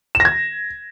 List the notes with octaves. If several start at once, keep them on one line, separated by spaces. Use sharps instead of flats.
E7
A#6
G#6